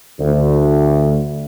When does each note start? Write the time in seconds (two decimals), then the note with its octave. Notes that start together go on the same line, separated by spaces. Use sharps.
0.20 D2